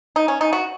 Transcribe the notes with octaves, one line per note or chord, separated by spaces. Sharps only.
D#4
C#4
D#4
F#4